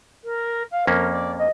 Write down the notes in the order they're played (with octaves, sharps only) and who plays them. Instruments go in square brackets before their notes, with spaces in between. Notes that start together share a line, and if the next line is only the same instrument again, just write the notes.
[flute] A#4
F5
[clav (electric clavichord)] F2 A#3 C#4 [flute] A#4
[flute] D5
D#5